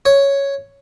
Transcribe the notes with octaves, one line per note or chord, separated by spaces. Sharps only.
C#5